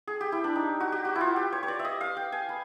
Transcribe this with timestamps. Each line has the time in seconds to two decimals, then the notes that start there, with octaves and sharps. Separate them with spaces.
0.07 G#4
0.21 G4
0.32 E4
0.44 D4
0.56 D#4
0.80 F#4
0.92 G4
1.05 F#4
1.15 E4
1.21 F4
1.36 G4
1.52 C#5
1.63 C#5
1.68 D5
1.79 E5
1.84 D#5
2.01 F5
2.17 G5
2.32 G#5
2.49 B5